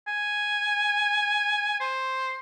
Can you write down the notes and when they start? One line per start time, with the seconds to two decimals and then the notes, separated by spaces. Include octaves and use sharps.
0.08 G#5
1.80 C5